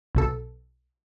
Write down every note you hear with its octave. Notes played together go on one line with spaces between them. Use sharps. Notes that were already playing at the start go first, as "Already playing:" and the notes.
B1 B2 A4